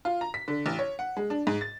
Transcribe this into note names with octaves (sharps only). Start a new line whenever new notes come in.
F4
A#5
B6
D3
A1
C#5
F#5
G#3
D4
G#2
A6